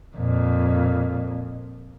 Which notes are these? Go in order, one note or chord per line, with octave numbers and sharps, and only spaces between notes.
F2 A#2